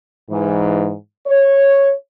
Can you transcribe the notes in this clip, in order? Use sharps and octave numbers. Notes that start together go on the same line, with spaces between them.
G#2 E3
C#5